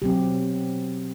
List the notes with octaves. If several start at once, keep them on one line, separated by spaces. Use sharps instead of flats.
B2 F#3 C4 G4